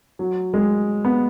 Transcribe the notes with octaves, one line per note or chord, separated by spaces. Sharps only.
F#3
G#3
B3